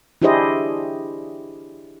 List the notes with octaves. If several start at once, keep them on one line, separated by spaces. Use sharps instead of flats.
D4 E4 G4 G#4 C5 D#5